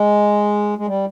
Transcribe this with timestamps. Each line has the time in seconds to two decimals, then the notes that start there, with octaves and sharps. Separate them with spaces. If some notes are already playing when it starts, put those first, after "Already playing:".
Already playing: G#3
0.78 G#3
0.87 G3